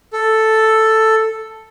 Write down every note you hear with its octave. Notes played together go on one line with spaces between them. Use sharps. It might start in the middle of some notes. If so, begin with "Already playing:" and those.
A4